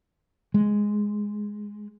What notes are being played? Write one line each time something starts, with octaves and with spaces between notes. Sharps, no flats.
G#3